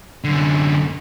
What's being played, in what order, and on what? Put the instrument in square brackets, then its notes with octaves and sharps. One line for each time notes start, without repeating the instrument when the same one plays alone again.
[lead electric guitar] F#2 D3